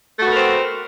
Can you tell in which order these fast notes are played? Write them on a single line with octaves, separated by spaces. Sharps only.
A3 F#4 B3 A#4 C4